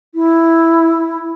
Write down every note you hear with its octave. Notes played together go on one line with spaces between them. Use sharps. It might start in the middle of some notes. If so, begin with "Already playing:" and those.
E4